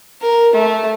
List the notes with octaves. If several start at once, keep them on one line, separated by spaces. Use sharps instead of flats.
A#4
A3